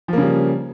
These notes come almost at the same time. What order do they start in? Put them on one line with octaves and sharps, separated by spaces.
F3 A#3 C#3 G3